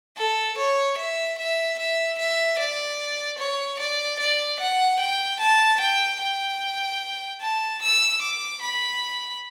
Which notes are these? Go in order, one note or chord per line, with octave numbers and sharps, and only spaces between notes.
A4
C#5
E5
E5
E5
E5
D5
C#5
D5
D5
F#5
G5
A5
G5
G5
A5
E6
D6
B5